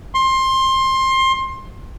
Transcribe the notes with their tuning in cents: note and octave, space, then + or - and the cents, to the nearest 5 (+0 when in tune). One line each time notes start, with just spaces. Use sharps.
C6 +20